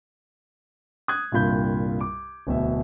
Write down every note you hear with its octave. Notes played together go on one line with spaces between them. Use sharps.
D#6 F#6 G#6
C2 G2 A#2 F4 B5 G6
D6
D1 B2 E5